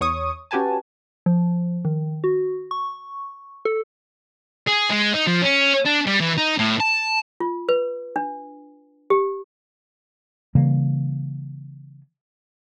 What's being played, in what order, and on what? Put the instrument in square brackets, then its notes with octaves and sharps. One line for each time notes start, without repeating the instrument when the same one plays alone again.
[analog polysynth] E2 C#5 C#6 D#6
C#4 F#4 G4 B4 G#5 A5
[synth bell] F3
D#3
F#4
C#6
A4
[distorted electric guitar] G#4
G#3
D#4
F3
C#4
D4
G3
E3
D#4
A2
A5
[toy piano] F4
B4
D4
G4
[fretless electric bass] C#3 E3 G3 A#3